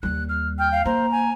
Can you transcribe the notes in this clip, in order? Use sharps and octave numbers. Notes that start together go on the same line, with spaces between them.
D#2 G3 F#6
F6
G5 F6
F5
A#3 C5 A#5
G#5